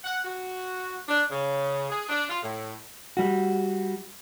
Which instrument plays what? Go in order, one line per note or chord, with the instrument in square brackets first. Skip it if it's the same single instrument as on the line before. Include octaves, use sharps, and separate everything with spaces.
[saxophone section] F#5
F#4
D4
C#3
G#4
D4
F4
A2
[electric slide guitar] G3 F#4